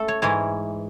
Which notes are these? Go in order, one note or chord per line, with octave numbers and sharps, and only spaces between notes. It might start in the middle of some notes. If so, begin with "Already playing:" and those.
Already playing: A3 A4
C#5
G#2 E3 C#5